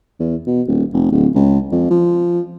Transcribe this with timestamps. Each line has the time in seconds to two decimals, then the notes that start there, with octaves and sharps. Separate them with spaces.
0.19 E2
0.46 B2
0.67 D#1
0.93 F1
1.12 D1
1.35 C#2
1.72 F2
1.91 F3